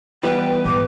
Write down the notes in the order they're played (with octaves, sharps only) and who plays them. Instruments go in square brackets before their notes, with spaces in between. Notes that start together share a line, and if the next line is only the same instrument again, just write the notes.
[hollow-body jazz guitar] E3 G3 B3 [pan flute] B4 [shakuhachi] G5
[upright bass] G#2 [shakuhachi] D6